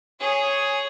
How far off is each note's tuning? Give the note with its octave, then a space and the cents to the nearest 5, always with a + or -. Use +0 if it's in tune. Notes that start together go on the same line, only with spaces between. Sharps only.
G#4 +0 C#5 +0